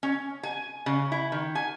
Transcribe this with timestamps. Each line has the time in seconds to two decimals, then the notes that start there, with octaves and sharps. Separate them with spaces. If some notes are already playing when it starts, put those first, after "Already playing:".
0.03 C#4
0.43 G#5
0.86 C#3
1.12 E4
1.32 D#3
1.55 G#5